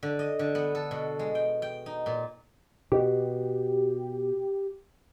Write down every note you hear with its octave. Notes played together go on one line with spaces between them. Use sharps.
D3
D#5
D3
B3
A4
B2
G#3
G5
G5
D#4
A#2
B2 G4